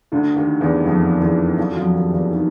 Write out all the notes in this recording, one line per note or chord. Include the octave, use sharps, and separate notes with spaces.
D2 D3
D#2 D#3
E2 E3
F2 F3
E2 E3
F2 F3
F#3
F2 F3
D#2 D#3
E2 E3
D#3